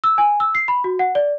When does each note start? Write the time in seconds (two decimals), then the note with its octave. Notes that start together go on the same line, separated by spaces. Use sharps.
0.04 E6
0.18 G#5
0.40 E6
0.55 C7
0.68 B5
0.84 F#4
0.99 F#5
1.15 D5